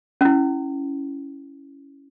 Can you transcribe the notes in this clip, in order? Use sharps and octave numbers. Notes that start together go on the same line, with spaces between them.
C#4 E4